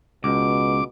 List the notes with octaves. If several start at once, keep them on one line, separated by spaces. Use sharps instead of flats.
C#2 B2 D6